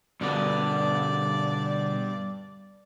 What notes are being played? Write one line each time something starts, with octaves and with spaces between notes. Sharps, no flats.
G2 B2 D3 B3 D5